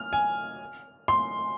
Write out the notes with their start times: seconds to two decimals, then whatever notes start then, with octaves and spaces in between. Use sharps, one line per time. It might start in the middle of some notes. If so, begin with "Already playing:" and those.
Already playing: F6
0.13 G#5
1.08 C6